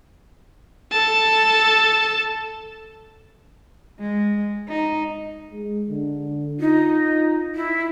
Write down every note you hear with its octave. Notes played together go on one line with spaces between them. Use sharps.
A4 A5
G#3
D#4
G#3
D3
D#4 F4
E4